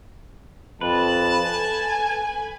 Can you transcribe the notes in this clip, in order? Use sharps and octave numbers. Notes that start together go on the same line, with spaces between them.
F2 B4 A5
A4 G#5